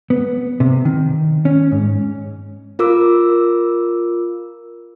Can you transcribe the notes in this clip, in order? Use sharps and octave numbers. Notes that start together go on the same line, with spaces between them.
B3
C3
D#3
C#4
G#2
F4 A#4 D6 E6